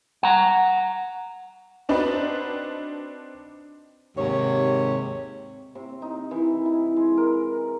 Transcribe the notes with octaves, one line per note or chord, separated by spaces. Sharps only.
F#5 A#5
C4 D4 D#4 F#4 B4
D#2 G#2 C3 C#5
C3
D#4
E3
E4
G#3
A#4